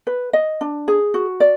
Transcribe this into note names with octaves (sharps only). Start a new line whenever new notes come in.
B4
D#5
D4
G#4
F#4
D5